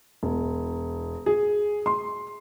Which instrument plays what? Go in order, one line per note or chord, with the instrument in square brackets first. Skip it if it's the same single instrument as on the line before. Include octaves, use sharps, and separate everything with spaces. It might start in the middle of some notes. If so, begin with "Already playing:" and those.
[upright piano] E1
G#4
C6